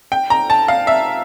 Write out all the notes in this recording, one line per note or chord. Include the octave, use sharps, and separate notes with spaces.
G5
A#5
A5
F5
E5